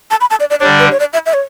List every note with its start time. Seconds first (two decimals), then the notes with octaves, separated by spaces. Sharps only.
0.11 A5
0.21 B5
0.30 A5
0.40 D5
0.50 D5
0.60 D4 C#5
0.63 D3 G3
0.79 B4
0.91 C#5
1.00 D5
1.13 E5
1.26 E5
1.33 C#5